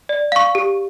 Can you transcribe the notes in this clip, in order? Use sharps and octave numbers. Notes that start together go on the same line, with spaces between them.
D5
F5 C#6
G4